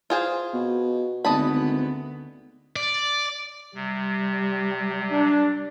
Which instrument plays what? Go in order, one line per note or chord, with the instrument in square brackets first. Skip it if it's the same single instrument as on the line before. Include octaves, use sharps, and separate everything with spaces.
[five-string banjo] F4 G#4 C5
[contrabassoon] B2
[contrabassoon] G#1 [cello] D2 B3 [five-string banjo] D#5 A5 B5
[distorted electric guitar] D5
[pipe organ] C3 [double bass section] G3
[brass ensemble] D4